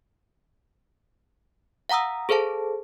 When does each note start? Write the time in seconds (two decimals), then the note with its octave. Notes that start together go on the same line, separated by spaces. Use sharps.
1.89 F5 F#5 A#5 D#6 E6
2.29 G#4 A4 C5 F5 A5